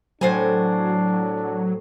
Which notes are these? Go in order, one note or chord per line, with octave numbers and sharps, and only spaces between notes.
A2 F#3 D4 C5 G#5